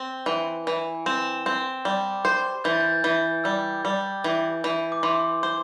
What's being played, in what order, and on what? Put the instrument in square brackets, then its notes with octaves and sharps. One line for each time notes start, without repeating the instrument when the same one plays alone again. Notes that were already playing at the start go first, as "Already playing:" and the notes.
Already playing: [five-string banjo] C4
E3
E3
[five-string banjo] C4 [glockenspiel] E7
[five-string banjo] C4
G3
C5
[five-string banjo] E3 [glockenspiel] G6
[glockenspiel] A6
G6
[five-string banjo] E3
[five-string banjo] G3 [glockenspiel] E6
[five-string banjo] G3
E3
E3
[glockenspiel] D6
[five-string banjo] E3 [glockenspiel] C6
[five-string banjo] C5